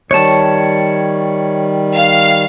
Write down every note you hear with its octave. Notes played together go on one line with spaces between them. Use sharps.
D#3 G3 C#5 A5
F5